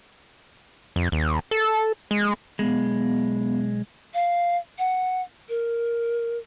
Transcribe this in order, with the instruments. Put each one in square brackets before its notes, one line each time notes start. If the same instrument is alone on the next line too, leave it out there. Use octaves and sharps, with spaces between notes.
[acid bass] F2
D#2
A4
G#3
[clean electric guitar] B1 G#3 [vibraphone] B3
[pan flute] F5
F#5
A#4